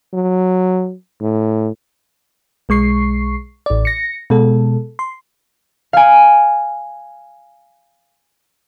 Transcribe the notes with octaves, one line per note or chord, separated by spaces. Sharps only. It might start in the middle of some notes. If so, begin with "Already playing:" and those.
F#3
A2
B1 G#3 C#6 C7
A1 D5
A#6 C#7
B2 G#3 A4
C6
F5 G#5